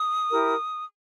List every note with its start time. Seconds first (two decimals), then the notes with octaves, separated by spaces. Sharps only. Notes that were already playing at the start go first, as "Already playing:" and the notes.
Already playing: D#6
0.30 E4 G4 A#4